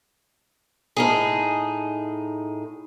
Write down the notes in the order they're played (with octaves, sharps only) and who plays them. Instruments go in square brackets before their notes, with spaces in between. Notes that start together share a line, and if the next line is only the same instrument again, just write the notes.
[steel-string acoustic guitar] A2 D#4 G#4